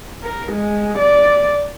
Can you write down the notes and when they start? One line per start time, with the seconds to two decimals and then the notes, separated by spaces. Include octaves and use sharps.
0.23 A#4
0.53 G#3
0.99 D5